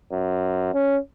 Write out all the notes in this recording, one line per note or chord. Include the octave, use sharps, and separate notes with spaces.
F#2
C#4